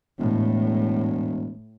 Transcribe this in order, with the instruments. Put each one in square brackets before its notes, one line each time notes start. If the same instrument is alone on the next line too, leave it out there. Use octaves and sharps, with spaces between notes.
[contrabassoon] E1 [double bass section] A2